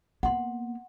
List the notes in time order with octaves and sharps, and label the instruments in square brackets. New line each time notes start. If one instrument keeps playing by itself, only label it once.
[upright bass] A#3 B3 [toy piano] F#5 C6